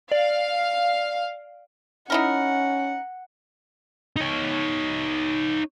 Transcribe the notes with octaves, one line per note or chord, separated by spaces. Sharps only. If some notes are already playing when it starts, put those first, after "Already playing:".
D5 F5
C#4 D#4 E4 A#4 F#5
D#4 C#5